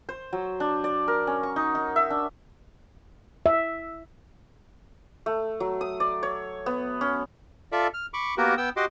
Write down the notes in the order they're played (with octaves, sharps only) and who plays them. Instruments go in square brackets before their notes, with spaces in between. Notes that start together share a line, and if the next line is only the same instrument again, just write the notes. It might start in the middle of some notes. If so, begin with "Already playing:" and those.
[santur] C5
F#3
D4
D5
A#4
C#4
C#6
D#4
D#4
E5
D4
[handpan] E5
[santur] A3
F#3
D#6
D5
C#5
B3
C#4
[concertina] F4 A4 D5 E5
F6
B5 C#6 D6
A#3 B3 F#4 G4 A#4
B3 G5 E6
F#4 G4 D#5 C6 D6